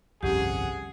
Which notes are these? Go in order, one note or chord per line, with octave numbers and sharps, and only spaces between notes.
G1 C2 F2 C#4 G4 G#4 F#5